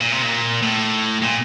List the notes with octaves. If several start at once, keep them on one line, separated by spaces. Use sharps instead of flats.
A#2
C3
A#2
A2
A#2